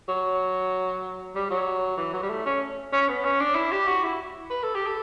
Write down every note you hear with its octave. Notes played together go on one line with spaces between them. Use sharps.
F#3
G3
F#3
E3
F#3
G3
A3
C#4
C#4
B3
C#4
D4
E4
G4
F#4
E4
B4
A4
G4
A4